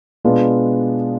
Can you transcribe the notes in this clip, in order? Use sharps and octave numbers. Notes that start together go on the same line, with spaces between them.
B2 G#3 B3 D4 F4